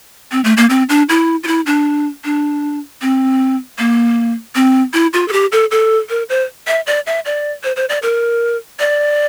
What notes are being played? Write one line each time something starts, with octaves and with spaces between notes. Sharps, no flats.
C4
A3
A#3
C4
D4
E4
F4
E4
D4
D4
C4
A#3
C4
E4
F4
A4
G4
A4
A4
A#4
C5
E5
D5
E5
D5
C5
C5
D5
A#4
D5